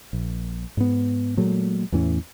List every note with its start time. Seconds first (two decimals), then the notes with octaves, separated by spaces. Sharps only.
0.13 A#1
0.77 G#2 B3
1.37 A#2 F#3 G#3 A3
1.92 E2 A2 E3 C#4